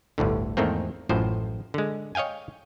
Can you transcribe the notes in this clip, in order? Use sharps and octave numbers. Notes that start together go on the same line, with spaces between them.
G1 D2 A2 D3
E2 G#2 D#3 A3 A#3 C4
A1 F#2 A2 F3 C5
D3 G#3
C#5 D#5 F5 G5 G#5